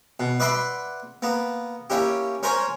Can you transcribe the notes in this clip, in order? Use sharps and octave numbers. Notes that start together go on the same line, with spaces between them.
B2
B4 D5 E5 F#5 B5 C6
A#3 B3
A#3 C#4 E4 G4
C#4 A#4 C5 C#5 G#5